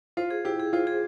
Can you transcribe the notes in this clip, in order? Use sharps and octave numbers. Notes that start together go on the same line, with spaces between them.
F4 C5
G#4
E4 G4
G#4
F4 C5
G#4